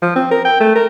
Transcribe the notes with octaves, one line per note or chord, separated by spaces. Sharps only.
F3
C4
A#4
G5
A3
A#4